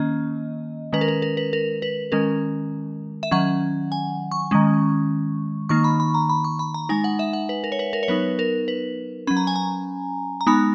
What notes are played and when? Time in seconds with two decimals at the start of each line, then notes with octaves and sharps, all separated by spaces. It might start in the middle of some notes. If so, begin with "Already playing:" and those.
Already playing: D#3 A#3 C#4 D#5
0.93 D#3 G#3 C#4 B4
1.01 A#4
1.08 B4
1.22 A#4
1.37 B4
1.53 A#4
1.82 B4
2.12 D#3 G#3 C#4 A#4
3.23 E5
3.31 D#3 F#3 C#4 F#5
3.92 G#5
4.31 C#6
4.51 D#3 G#3 C#4
5.69 D#3 A#3 D#4 C#6
5.84 B5
6.00 B5
6.14 A#5
6.29 B5
6.44 C#6
6.59 B5
6.74 A#5
6.89 G#3 D#4 G#5
7.04 F#5
7.19 E5
7.33 F#5
7.49 B4
7.64 A#4
7.72 C#5
7.79 B4
7.93 A#4
8.03 C#5
8.08 F#3 B3 D#4 B4
8.39 A#4
8.68 B4
9.27 F#3 C#4 B5
9.37 A#5
9.47 G#5
9.56 A#5
10.41 A#5
10.47 G#3 B3 D#4 B5